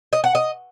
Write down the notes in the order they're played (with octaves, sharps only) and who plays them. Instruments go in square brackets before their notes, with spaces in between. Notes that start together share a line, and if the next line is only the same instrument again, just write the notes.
[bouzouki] D#5
F#5
D#5